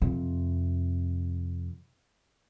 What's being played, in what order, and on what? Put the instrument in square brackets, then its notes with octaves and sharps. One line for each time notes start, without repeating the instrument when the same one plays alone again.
[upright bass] F2 C3